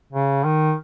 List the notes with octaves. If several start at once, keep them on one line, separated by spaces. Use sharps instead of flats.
C#3
D#3